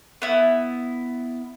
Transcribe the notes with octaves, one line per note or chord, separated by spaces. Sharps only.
B3 E4